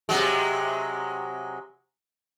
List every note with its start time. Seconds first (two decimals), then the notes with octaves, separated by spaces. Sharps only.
0.09 C3 F#3 G#3